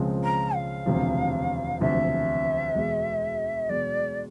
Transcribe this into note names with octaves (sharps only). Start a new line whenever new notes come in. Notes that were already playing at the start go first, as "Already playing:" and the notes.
Already playing: C#2 C#3 F3 G#3 C4
A#5
F5
E1 D2 C3 F3
E1 D2 C3 F3 E5
E2 B2 G#3
E2 B2 G#3 D5